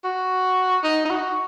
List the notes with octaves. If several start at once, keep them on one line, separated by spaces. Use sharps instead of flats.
F#4
D#4
D#4
F#4